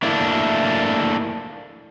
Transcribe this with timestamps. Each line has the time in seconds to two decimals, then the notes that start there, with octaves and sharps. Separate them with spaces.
0.03 A3 A#3 D4 E4